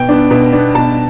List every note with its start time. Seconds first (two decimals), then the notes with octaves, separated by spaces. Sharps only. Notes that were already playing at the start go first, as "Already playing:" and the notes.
Already playing: B2 G5
0.09 B3 D4
0.30 B2
0.53 B3 D4
0.75 B2 A5